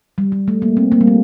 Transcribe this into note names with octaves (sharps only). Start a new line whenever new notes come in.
G3
G3
A3
A#3
C4
A#3
G3
A3